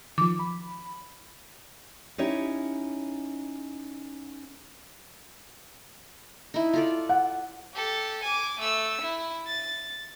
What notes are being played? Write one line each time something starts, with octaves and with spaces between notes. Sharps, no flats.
D#3 F3 D6
B5
C#4 D#4 E4 G4 C#5
D#4 E4
F4 A4 D5
F#5
G4 A4
G#5 D6
A3 E6
E4
A6